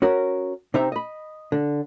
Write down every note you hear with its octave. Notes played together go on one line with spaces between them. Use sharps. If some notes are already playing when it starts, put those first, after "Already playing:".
C#4 F#4 A#4
C3 C4 D#4 E5 A#5
D#5 B5
D3